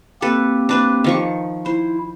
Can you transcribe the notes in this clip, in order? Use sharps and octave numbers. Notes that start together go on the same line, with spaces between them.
A#3 C4 G4 A4 B4
D4 B4 C5
D#3 F3 C#6
E4 C5